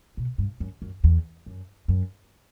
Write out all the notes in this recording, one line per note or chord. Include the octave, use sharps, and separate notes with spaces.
B2
G2
F#2
F#2
E2
F#2
F#2